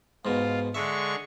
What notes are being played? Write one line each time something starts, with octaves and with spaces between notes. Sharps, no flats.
G#2 B2 F4
D3 G#3 E5 C#6